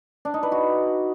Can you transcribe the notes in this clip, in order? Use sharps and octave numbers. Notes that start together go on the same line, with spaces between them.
D4
D#4
B4
F#4